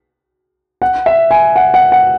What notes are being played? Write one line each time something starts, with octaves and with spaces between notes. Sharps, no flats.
F#5
E5
G#5
F#5
F#5
F#5